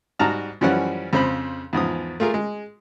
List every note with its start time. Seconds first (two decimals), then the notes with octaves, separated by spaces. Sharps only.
0.19 G#2 G3 F#4 A5 A#5 F6
0.61 F#2 E3 F3 G3 C#4 F#5
1.13 F2 C#3 C5 B5
1.73 E2 G#2 F3 D#6
2.20 A3 F4 G#4 A#4
2.34 G#3